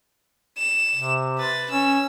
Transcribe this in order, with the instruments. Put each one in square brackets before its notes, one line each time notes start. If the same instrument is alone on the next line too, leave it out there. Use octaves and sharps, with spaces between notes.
[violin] E7
[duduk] C3
[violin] B4 A6
[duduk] C#4 [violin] E6